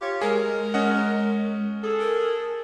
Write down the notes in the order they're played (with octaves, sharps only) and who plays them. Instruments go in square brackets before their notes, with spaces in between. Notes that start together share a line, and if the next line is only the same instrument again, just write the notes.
[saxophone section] F4 G4 C#5
[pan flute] G#3 [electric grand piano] G#4 [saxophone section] A#4
[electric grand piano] C#4 D#5 F#5
[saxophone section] G#4 A4
[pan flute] A#4